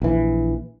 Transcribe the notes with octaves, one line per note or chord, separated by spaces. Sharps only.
A#1 E3